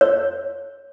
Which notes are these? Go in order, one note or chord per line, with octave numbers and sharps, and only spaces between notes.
C#5